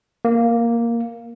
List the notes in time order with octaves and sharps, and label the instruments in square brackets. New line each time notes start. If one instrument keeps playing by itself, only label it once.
[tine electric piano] A#3